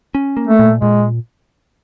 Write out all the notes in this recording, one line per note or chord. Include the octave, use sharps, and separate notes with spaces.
C#4
A#3
A3
A#2
A#2 G#3